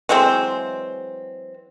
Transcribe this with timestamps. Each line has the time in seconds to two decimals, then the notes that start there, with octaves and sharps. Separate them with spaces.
0.09 E3 F#3 G#3 C4